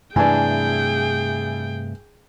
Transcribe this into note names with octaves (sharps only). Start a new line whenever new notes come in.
G2 C3 E3 A3 D4 G#4 G5 G#5